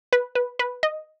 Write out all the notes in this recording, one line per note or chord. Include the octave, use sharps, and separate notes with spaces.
B4
B4
B4
D#5